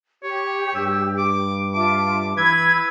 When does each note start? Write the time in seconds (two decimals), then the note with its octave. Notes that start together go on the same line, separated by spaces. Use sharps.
0.23 G4 C#5
0.75 G2 E6
1.18 D6
1.74 F4 E5 A5 D6
2.37 E3 B4 B5 E6 G#6